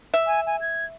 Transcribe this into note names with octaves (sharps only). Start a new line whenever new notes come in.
E5
G#5
G#5
G#6